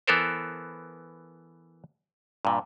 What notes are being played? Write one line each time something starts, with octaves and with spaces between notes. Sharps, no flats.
E3 B3 A4 A#4 C5
G2 A#2